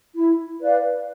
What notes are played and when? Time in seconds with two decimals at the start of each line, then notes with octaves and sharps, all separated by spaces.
0.15 E4
0.62 B4 D5 F5